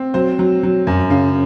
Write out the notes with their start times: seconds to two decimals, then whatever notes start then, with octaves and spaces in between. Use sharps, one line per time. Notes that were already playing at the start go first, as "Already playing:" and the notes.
Already playing: C4
0.14 F#3 C5
0.39 F#3
0.63 F#3
0.87 F#2
1.10 C#3